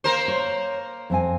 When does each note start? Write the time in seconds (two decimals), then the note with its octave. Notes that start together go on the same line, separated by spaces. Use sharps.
0.04 A#3 A#4 C5
0.28 C#5
1.10 F2 C4 G#5